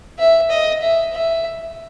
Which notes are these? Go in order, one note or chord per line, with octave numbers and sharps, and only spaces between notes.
E5
D#5
E5
E5